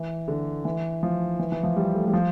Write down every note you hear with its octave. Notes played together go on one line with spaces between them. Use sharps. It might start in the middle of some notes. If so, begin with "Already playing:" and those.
Already playing: E3
D3
E3
F3
E3
E3
F3
G3
A3
G3
F3